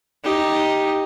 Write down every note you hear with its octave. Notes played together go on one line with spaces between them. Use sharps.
D#4 G4